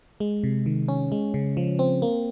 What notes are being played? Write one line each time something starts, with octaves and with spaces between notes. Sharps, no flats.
G#3
C3
D#3
C#4
G#3
C#3
F3
C4
A#3